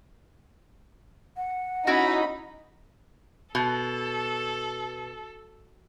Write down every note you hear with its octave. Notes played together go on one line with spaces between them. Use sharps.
F#5
C#4 D#4 E4 F#4 B5
B2 A4